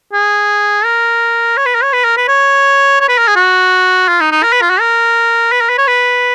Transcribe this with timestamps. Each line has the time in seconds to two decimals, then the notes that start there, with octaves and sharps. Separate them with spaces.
0.13 G#4
0.85 A#4
1.57 C#5
1.66 B4
1.75 A#4
1.83 C#5
1.93 B4
2.05 A#4
2.17 B4
2.28 C#5
3.01 C#5
3.09 B4
3.18 A#4
3.28 G#4
3.36 F#4
4.08 F4
4.20 D#4
4.32 D#4
4.43 A#4
4.52 B4
4.62 F4
4.70 F#4
4.80 A#4
5.52 B4
5.61 A#4
5.69 B4
5.78 C#5
5.87 B4